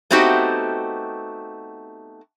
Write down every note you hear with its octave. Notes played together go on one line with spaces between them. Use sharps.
A3 B3 C4 D#4 F#4 G4